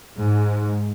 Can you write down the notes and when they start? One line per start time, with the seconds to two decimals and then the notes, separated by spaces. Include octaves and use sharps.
0.21 G#2